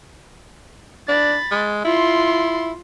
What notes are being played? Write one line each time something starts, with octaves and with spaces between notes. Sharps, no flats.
D4 B5 A6
G#3
E4 F4 C6